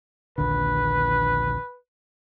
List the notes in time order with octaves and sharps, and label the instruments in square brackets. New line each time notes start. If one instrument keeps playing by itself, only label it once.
[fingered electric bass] A#1 D#2 D3 [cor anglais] B4